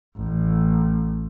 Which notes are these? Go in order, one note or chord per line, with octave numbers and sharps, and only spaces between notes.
A1